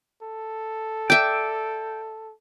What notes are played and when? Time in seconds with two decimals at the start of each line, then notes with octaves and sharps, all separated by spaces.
0.22 A4
1.10 D5 E5 G5